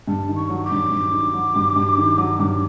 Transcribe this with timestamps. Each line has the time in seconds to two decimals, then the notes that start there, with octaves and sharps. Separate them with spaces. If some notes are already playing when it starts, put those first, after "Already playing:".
0.08 G2 A5
0.29 D#3
0.36 C#6
0.49 F#3
0.64 D6
0.71 G2
0.91 G2
1.13 D#3
1.34 F#3
1.56 G2
1.76 G2
1.98 D#3
2.18 F#3
2.39 G2